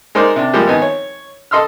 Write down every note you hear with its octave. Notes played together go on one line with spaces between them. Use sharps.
G#3 D#4 A#4 C5 D5
C3 D4
F3 G3 G#3 A#3 G4
G#1 B3 D#4 G#5
C#5
A4 D#5 C6 E6 F6